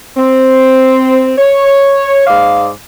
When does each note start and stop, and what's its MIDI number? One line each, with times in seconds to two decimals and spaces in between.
0.17 1.32 60
1.38 2.24 73
2.27 2.68 44
2.27 2.68 74
2.27 2.68 77